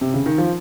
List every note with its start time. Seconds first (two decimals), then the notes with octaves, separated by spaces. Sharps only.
0.01 C3
0.14 C#3
0.26 D#3
0.38 F3